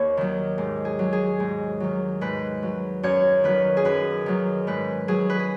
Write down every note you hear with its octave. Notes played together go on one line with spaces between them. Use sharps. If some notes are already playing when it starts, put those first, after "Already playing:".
Already playing: D#2 C#5
D#3 F#3
G#2
G#4
F#3
G#4
G#2
D#3 F#3
G#2 B4
F#3
F#2 C#5
D#3 F#3 B4
G#4
F#2 B4
D#3 F#3
G#2 B4
F#3 G#4
B4
G#4